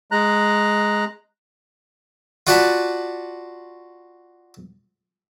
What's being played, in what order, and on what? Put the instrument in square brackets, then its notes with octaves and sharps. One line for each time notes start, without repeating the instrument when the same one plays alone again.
[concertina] G#3 A#5 F#6
[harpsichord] F4 F#4 D5 F#5 A5 B5